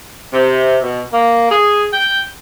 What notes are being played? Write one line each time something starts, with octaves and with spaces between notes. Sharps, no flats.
C3
B2
A#3
G#4
G5